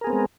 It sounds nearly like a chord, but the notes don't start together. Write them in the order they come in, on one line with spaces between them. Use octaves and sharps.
A#4 G#4 B3 C4 G#3